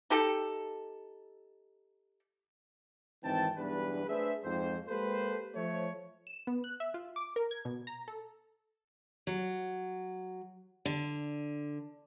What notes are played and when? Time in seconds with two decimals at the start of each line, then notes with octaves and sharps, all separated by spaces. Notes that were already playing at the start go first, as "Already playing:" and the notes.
0.10 D#4 G4 A4
3.24 G#1 E3 C4 D#4 G5 A5
3.58 B1 E2 G2 D4 B4
4.08 A3 D4 G#4 B4 C5 E5
4.43 F2 G#2 C5
4.88 G#3 A#3 G4 A4 B4 C5
5.56 F3 A3 C5 C#5
6.27 E7
6.47 B3
6.64 F#6
6.80 E5
6.94 F4
7.16 D6
7.36 A#4
7.51 G#6
7.65 B2
7.87 A#5
8.08 A4
9.27 F#3
10.85 D3